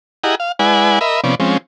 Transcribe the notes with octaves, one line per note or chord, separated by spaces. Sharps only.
E4 G4 G#4 D#5 F#5 A#5
F5
G#3 E4 B4 D5 F#5 G#5
A#4 D#5 E5 B5
C3 F3 B3 C#4 D5
F3 G#3 C4 C#4